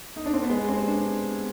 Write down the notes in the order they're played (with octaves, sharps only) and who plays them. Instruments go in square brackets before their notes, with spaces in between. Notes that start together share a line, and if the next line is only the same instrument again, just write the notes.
[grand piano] D#4
D4
C4
B3
[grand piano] G#3 [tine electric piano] B4
[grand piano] C4
[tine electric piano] G4
[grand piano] D4
[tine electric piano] B3
B3